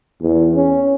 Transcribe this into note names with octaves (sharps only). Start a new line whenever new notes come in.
E2
C#4